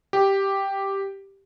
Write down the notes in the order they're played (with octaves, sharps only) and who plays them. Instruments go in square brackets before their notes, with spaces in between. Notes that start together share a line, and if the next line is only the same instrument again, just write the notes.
[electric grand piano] G4